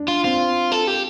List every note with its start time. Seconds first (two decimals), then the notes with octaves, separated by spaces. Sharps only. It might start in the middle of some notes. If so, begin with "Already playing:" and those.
Already playing: D4
0.08 F4
0.24 C4 F4
0.72 A4
0.87 G4